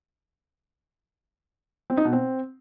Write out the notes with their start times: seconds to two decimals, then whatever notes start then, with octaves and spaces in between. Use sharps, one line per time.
1.90 C4
1.97 D#4
2.05 B2
2.13 C4